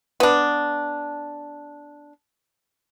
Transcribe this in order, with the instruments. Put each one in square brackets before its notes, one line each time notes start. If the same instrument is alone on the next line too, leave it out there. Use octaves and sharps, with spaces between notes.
[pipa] B3 D4